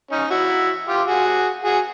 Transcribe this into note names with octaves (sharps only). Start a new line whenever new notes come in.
C#4 D#4
E4 F#4
F4 G4
F#4 G#4
F#4 G#4